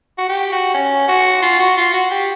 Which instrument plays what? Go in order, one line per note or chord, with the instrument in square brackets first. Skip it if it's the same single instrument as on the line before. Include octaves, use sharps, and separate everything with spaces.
[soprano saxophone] F#4
G4
F#4
C#4
F#4
F4
F#4
F4
F#4
G4